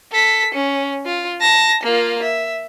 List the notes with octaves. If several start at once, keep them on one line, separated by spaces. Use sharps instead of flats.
A4 B6
C#4
F4
A5 A#6
A#3 F4
E5